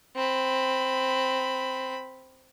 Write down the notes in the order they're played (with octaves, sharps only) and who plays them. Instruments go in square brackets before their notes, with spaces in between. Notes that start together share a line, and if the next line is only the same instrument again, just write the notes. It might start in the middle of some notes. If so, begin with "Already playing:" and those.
[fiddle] C4 B5